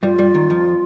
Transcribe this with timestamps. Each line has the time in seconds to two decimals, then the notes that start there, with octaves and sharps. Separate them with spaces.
0.03 G2 G3 F4
0.18 G2 G3
0.34 D#2 D#3
0.50 F2 F3